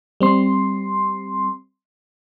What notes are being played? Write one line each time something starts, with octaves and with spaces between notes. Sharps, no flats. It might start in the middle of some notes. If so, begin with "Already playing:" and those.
G3 C4 C6